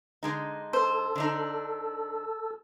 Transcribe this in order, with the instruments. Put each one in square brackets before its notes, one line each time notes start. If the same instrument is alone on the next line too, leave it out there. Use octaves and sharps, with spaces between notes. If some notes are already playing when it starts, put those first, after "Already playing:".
[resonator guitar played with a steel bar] D3 G#3 D#4
[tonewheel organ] A4 [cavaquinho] C5
[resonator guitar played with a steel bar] D3 D4 D#4